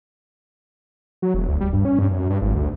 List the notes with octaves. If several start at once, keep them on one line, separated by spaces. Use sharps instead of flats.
F#3
E1
D2
G3
G2
C#4
G2
F#2
G2
G#1
D2